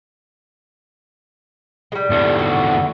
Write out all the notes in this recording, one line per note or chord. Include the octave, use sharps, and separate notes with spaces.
G3 G#3
E2 D3
F#4